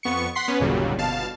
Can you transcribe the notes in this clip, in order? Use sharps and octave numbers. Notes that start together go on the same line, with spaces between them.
F2 B3 C#6 C#7
F#5 C6 B6 C7
B3 C#4 B4
G1 D#2 A#2 C#3 F#3 G3
G1 B2 F5 A5